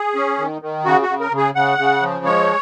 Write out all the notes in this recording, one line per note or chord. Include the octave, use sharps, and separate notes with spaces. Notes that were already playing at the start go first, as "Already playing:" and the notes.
Already playing: G#4
C#4
D#3
D#3
C#3 F#4
F#4
C#3
A#4
C#3
G#4
C#3 F#5
C#3
F3
G#3 C#5